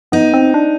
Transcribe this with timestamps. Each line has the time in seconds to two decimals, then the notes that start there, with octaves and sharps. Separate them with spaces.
0.12 B3 D#4
0.34 C4
0.54 D4